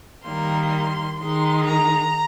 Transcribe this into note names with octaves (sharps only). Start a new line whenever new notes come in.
D#3 G3 A#3 C6
D#3 G#3 D#4 C6
A#5